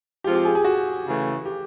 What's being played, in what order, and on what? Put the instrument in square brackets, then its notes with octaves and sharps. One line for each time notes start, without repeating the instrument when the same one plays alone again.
[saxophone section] F3 G#3 C4 F4 [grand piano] G4
[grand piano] G4
G#4
G#4
F#4
[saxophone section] C#3 E3 A3
[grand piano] G4